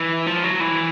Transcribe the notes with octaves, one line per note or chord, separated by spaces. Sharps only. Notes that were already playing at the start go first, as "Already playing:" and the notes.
Already playing: E3
F3
F#3
E3